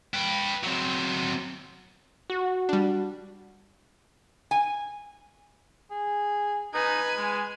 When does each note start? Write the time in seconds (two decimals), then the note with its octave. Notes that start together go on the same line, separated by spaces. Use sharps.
0.14 B4 G5
0.63 F#3 C4
2.30 F#4
2.69 G3 D4
4.51 G#5
5.91 G#4
6.74 D#4 B4 G#5
7.17 G#3